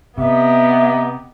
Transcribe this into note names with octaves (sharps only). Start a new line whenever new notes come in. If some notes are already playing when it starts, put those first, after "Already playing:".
C3 B3 G4 A#4 D#5 E5